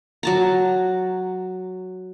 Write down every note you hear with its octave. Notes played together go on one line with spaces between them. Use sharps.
F#3 A5 A#5